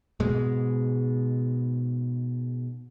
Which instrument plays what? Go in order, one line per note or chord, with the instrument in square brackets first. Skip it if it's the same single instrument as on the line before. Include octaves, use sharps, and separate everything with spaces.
[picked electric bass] G#2 B2 G#3